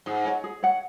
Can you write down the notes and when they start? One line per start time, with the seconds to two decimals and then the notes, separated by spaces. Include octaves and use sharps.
0.06 G#2 G#4
0.25 C#5 F#5
0.44 G#4
0.63 C#5 F#5